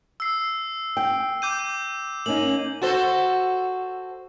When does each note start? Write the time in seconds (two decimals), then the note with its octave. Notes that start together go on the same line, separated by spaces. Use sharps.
0.20 E6 C7
0.97 G5
1.42 D6 G6 D#7
2.26 A#3 C#4 D#4 F#7
2.82 F#4 A4 C5